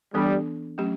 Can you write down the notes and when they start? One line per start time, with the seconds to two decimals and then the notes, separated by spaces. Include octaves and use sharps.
0.14 E3 G3 B3 D4 A4
0.78 F#3 A3 C#4 G4